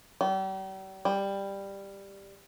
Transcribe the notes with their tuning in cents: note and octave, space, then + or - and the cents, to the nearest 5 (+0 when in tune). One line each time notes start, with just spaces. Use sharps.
G3 -40
G3 +10